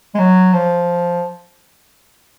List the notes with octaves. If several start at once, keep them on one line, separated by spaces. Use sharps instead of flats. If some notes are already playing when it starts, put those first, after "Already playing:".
G#3
F#3
F3